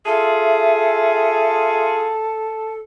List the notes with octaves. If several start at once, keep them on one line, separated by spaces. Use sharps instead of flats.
F4 G#4 A4 E5 A5